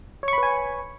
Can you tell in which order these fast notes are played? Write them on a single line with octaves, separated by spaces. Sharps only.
C#5 C#6 B5 B4 G#5